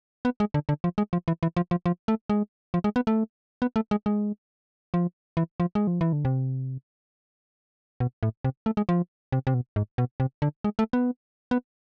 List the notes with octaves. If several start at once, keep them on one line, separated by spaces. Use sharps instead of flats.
B3
G#3
D3
D3
F3
G#3
F3
E3
E3
F3
F3
F3
A3
G#3
F3
G#3
B3
A3
B3
A3
G#3
G#3
F3
E3
F3
G#3
F3
E3
D3
C3
B2
A2
C3
A3
G#3
F3
C3
C3
B2
G#2
B2
C3
D3
G#3
A3
B3
B3